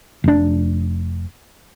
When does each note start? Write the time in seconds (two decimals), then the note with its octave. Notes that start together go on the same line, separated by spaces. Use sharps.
0.24 F1 D4